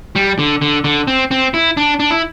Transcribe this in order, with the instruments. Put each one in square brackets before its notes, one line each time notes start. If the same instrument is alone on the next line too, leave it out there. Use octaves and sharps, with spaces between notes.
[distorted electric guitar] G3
D3
D3
D3
C4
C4
E4
D4
D4
E4